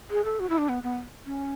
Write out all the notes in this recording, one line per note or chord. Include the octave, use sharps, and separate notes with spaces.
G#4
A4
F#4
E4
D4
B3
B3
C#4